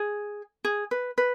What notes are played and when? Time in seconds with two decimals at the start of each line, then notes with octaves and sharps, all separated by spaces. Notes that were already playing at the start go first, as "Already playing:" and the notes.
Already playing: G#4
0.64 G#4
0.91 B4
1.18 B4